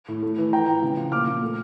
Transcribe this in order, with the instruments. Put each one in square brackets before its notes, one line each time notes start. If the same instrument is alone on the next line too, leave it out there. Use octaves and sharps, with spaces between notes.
[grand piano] A2
A3
E3
F3 G5 A#5
A2
C#3
F3
A#2 D6 F6
A#2
A3